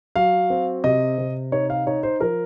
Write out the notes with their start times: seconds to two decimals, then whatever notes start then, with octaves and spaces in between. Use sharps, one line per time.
0.16 F#3 F5
0.50 C4
0.84 C3 D#5
1.18 C3
1.52 D#4 C#5
1.70 F5
1.87 D#4 C#5
2.03 C5
2.20 F3 A#4